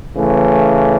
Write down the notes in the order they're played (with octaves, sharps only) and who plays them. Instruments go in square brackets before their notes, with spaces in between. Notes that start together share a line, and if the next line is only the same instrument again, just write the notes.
[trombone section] C#3 E3 A3